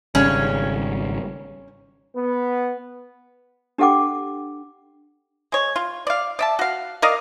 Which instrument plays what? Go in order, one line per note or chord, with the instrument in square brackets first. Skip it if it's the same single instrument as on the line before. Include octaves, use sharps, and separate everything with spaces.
[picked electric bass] G#1 C#3 G3 [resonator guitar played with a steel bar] C#4
[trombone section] B3
[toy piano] D4 G4 A4 F#5 G5 D6
[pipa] G#3 C#5
F4
D5 F5
D5 E5 A5
F#4 F5
A#4 D5 D#5 F5